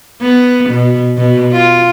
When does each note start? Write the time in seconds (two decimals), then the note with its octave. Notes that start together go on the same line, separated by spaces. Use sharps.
0.21 B3
0.70 B2
1.17 B2
1.52 F4